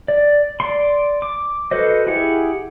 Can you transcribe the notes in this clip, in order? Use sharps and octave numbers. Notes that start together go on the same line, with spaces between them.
D5
D5 C6
D6
F#4 A4 B4 C5 D#5
E4 G4 G#4 F#5